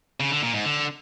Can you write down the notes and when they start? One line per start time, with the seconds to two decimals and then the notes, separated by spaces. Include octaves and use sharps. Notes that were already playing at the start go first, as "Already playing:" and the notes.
0.20 C#3
0.31 D3
0.43 A#2
0.54 G#2
0.65 D3